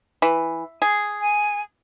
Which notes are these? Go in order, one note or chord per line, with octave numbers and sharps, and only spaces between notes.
E3
G#4
G#5